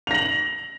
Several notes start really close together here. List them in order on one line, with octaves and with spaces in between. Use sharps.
F7 A#6 F#7